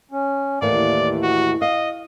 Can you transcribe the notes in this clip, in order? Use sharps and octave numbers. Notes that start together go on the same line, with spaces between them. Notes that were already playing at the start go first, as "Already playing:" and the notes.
C#4
D#2 A2 E3 A#3 D5
F#4
D#5 F5